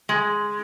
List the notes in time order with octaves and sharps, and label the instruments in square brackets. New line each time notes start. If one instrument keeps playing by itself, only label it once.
[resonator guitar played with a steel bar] G#3